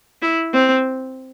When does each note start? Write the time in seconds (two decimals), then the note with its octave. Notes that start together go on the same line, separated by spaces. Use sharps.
0.22 E4
0.53 C4